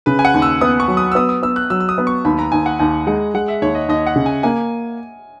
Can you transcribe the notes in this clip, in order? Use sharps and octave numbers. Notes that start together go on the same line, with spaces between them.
C#3 B4
G#5
F#5
D#2
E6
B3 D#6
C#6
F#3
D#6
E6
B3 D#6
D#6
B3 E6
F#6
F#3 E6
E6
D#6
B3
C#6
D#2 B5
A#5
D#2 G#5
F#5
D#2 G#5
G#3 F#5
G#3 F#5
E5
D#2 C#5
D#5
D#2 D#5
F#5
C#3
G#5
A#3 G#5